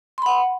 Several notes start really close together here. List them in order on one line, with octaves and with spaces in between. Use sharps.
C6 B5 F#5